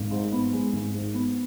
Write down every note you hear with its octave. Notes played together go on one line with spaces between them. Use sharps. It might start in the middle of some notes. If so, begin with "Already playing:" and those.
Already playing: G#1
G#2
B3
G#3
G#1
G#2
B3